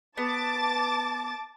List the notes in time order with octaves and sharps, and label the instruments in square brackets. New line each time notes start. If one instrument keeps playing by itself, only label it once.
[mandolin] B3 [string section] A5 D6 A6